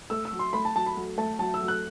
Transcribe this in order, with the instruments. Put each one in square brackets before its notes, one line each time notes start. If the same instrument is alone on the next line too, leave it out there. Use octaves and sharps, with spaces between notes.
[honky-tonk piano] A3 [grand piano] E6
[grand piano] E6
[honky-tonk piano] F#3
[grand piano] C6
[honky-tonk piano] A3 [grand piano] B5
[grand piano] A5
[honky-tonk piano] F#3 [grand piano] A5
[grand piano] B5
[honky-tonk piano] F#3
[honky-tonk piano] A3 [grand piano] A5
[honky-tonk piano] F#3 [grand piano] A5
[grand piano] E6
[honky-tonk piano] F#3
[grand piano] F#6